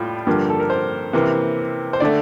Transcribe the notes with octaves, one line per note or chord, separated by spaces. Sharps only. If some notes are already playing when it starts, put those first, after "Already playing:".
Already playing: A2 G3 F4
G2 D3 F3 A#3 G4
A4
A#4
C5
C3 E3 A#3
C5
D3 A3 D5